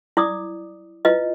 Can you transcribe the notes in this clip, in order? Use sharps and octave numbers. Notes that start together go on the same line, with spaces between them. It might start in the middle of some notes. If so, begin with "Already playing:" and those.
E4 D5 D6 D#6
E4 F4 B4 D#5